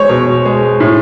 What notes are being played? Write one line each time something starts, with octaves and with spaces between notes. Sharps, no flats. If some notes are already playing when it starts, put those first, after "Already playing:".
Already playing: G#3 C5 C#5
B2
G#3
A2